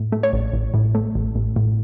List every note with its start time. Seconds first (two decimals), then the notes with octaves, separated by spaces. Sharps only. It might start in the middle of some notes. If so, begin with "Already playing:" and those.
Already playing: A2
0.12 A3
0.23 C#5
0.33 A1
0.53 A1
0.74 A2
0.95 A3
1.15 A1
1.35 A1
1.56 A2